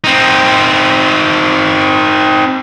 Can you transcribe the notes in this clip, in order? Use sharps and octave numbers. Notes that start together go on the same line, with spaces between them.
C4 D#4